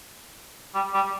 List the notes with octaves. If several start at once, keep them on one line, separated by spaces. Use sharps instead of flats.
G3
G3